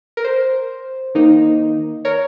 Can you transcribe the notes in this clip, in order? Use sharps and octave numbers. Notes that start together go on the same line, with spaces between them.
A#4
C5
D#3 A#3 D#4
A#4 C#5